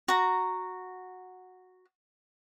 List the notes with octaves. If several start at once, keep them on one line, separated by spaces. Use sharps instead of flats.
F#4 A#5